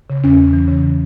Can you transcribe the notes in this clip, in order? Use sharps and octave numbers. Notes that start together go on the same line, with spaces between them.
C#3
E2 C#4
E2
E3
C#3